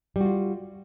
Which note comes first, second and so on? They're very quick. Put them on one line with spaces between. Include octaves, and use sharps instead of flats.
G3 F#4 F4